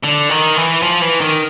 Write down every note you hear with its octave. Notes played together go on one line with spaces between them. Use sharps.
D3
D#3
E3
F3
E3
D#3